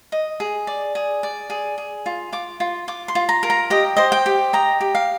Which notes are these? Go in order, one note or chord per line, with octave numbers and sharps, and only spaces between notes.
D#5
G#4
D5
G#4
D5
G#4
G#4
F4
F4 D6
F4
F4 D6
C6
F4
A#5
A#4
A#5
G4 D#5
C5 D#5
G5
G4
D#5 A#5
G4
F5